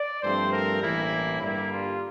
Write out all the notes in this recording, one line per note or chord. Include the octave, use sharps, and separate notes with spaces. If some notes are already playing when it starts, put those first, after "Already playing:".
Already playing: D5
G2 F3 A3 C4 C5
A#4
A1 G2 E3 A#3 E4
G2 D3 G3 A#3 E4
F4